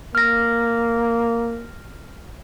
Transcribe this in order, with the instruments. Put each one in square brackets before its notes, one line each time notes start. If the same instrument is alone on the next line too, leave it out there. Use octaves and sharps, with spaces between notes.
[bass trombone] A#3 [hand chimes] F6 A#6